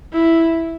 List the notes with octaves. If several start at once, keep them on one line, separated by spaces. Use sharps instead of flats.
E4